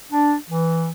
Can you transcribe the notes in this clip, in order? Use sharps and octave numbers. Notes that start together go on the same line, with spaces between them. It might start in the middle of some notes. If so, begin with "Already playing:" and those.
D4
E3